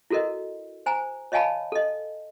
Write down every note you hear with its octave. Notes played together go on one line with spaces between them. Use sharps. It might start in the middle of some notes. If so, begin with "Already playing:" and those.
E4 F#4 A4 A#4 D#5
C5 G#5 A#5
C#5 D#5 F5 G#5 A5 B5
A4 D#5